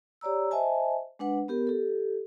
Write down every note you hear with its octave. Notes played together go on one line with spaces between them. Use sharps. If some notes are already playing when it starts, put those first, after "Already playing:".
G4 C#5 D5 A#5 E6
C5 D#5 E5 G#5 A5
G#3 D4 B4 F#5
B3 G4 A#4
G4 A4